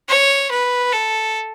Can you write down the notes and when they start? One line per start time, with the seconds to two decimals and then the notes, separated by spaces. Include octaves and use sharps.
0.09 C#5
0.51 B4
0.93 A4